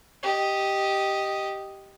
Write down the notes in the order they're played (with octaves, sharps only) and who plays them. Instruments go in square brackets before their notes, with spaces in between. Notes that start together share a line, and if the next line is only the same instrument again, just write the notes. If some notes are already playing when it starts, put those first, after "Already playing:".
[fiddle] G4 D#5